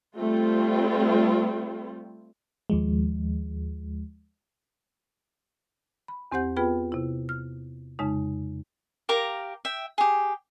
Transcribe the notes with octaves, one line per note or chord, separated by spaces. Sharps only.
G3 A3 C4 F4
D#2 F3 G#3
B5
E2 C4 G4 C5 F#5 G6
B3 F4 G#4 B4 G5 B5
C3 E4
F6
F2 C#3 G#3 D#4
G4 A#4 F5 A#5
E5 G5
G4 G#4